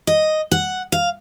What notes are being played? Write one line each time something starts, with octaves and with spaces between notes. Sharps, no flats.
D#5
F#5
F5